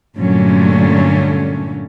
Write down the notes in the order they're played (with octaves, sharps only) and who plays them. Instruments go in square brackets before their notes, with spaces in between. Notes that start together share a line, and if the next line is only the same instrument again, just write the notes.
[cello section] G2 A#2 D3 F#3 A3 C#4